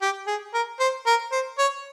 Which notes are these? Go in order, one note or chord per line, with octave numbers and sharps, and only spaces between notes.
G4
G#4
A#4
C5
A#4
C5
C#5